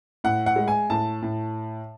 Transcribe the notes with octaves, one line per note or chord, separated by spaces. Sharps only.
A2 F#5
F#5
G#3
G#5
A2 A5
A2